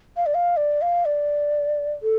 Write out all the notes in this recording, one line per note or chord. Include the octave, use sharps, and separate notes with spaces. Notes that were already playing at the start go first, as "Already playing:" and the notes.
F5
D5
F5
D5
F5
D5
A4